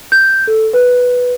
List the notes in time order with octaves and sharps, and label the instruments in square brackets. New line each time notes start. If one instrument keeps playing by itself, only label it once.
[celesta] G6
A4
B4